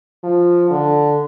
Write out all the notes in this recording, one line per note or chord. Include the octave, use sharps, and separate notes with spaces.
F3
D3